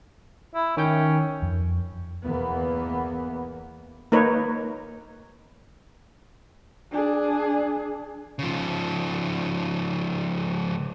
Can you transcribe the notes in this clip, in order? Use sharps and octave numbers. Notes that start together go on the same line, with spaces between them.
E4
D#3 C#4 G5 G6
F2
E2 E3 A#3 B3
A#3 D#4 A#4 B4 C#5
D4 G#4
C#3 F3